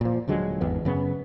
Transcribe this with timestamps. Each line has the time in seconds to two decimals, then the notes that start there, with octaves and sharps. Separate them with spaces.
0.01 A#2 F3
0.28 D#1 D3 F#3 G#3
0.61 G#1 E2 B3
0.85 F#2 C#3 B3